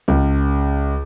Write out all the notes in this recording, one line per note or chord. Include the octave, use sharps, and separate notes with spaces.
C#2